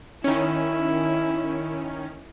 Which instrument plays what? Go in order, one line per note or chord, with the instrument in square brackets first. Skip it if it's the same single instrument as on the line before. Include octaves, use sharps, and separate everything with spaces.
[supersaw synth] D#3 C#4 [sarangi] E4